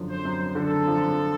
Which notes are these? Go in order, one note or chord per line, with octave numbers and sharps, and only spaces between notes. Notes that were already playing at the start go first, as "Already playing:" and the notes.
Already playing: F#2 D3 F3
C5
F#2
D3 A4
F3